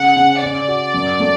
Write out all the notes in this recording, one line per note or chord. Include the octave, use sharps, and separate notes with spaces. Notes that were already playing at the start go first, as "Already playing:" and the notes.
Already playing: C#3 F#5
C#3
C#3 D5
F#4
F#2
A3